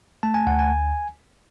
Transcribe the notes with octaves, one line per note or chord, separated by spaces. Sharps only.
A3 A5
G#5
D2 F#5
G#5